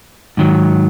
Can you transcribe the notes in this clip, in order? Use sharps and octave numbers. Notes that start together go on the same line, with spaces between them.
G#2 D#3 F#3